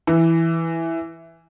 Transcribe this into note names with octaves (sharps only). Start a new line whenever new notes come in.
E3